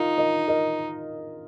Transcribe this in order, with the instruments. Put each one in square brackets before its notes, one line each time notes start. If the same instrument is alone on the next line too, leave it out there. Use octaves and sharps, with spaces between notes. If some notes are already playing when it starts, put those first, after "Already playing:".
Already playing: [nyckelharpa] D#4 [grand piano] F4 A#4
[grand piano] A#4 D#5
A#4 D#5